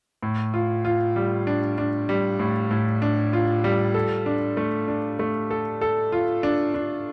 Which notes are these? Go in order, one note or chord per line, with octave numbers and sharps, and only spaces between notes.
A2
F4
F4
G3
D4
D4
G3
A2
A2
D4
F4
G3
A4
D4
A3
D4
A3
A4
A4
F4
D4
D4